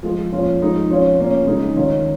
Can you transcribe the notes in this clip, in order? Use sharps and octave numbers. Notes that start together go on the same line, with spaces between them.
F3 G#3 F4
A#2 F3 C#4 F4
F3 G#3 D#4
F3 C#4 F4
A#2 A#3 C#4
C#3 G#3 D#4
D#3 C#4 F4